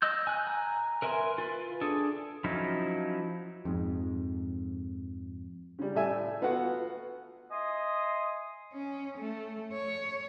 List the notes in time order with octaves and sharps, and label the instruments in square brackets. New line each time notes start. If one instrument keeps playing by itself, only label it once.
[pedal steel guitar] D#5 E6 G6
G#5 F#6
G#5 A#5
A#4 B4 E5 G#5 C6
F4 B4
D4 G#4 A4
F3 F#3 C#4 D#4 E4
[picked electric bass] F2 G#2
[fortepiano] C#3 G3
A2 G3 E5 G#5
A3 B3 F4 F#4 F#5
[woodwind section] D#5 E5 G#5 C6 D#6
[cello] C#4
A3
C#5